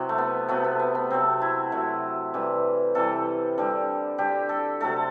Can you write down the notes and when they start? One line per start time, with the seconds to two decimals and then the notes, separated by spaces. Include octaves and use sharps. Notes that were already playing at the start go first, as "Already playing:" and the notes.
Already playing: C3 F#3 E4 G4
0.09 A3
0.18 B3
0.48 C3 F#3 A3 B3
0.64 B3
0.79 B3
0.95 B3
1.10 C3 F#3 A3 C4
1.42 E4
1.72 C3 F#3 A3
2.34 C3 E3 G3
2.95 C3 E3 G3 A4
3.58 D3 G3
4.18 D3 G3 G4
4.49 A4
4.80 C3 F#3 A3 A4